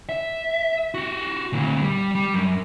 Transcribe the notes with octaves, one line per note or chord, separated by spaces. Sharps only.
E5
F#4 G4
D2 A#2
G3
G3
F#2